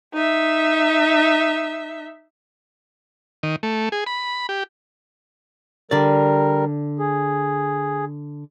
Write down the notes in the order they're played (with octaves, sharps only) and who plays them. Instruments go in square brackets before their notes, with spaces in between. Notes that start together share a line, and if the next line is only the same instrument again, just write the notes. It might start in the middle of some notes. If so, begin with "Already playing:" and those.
[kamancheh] D#4 E5
[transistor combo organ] D#3
A3
G#4
B5
G4
[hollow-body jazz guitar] D3 D5 [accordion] G3 A#4
[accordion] G#4